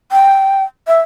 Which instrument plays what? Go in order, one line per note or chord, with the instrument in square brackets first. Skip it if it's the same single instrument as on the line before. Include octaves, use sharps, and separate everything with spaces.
[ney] G5
E5